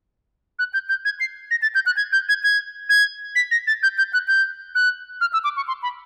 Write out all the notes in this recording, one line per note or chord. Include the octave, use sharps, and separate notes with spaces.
F#6
G6
G6
G#6
C7
A#6
A6
G6
F#6
G#6
G6
G#6
G#6
G#6
B6
A#6
A6
G6
G6
F#6
G6
F#6
F6
E6
D6
C#6
C6
B5